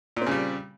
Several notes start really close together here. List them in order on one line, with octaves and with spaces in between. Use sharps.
A#2 C4 C#3 G3